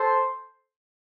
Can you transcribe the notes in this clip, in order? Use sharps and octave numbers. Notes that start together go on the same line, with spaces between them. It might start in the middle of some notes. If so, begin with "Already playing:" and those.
Already playing: A4 C5